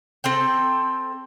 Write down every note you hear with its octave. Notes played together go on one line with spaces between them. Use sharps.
C4 A4 G5